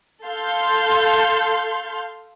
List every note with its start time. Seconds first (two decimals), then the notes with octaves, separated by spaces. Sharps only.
0.25 A4 F5 C6 G6